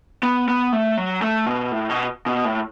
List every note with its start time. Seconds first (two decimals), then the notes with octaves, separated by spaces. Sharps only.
0.23 B3
0.48 B3
0.73 A3
0.97 F#3
1.22 A3
1.46 B2
1.71 A2
1.90 B2
2.26 B2
2.45 A2